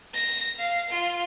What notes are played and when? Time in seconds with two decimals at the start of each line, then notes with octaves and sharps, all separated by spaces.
0.14 A#6
0.59 F5
0.90 F4